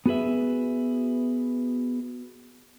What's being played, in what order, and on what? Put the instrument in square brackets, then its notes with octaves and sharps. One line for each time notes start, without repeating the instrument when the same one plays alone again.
[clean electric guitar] B3 F#4 G#4 B4 E5